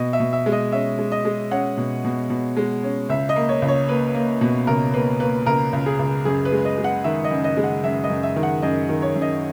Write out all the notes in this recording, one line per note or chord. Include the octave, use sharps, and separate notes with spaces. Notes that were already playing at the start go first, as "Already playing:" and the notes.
Already playing: B2 D#5
E5
B2
E5
G#3
D#5
C#4 E5
G#3
D#5
G#3
C#4 F#5
B2
B2
B2
G#3
C#4
C#2 E5
D#5
A#3
C#5
C#2
C#5
A#3 B4
A#3
B2
C#2 A#4
A#3 B4
A#3 B4
C#2 A#4
C#2
G#4
C#2
F#2 G#4
B4
G#3
D#5
G#3
F#5
D#3 E5
D#5
F#2
D#5
G#3
F#5
F#2 E5
D#5
F#2
E5
D#3
F#5
F#2 D#5
D#3
C#5
F#2
D#5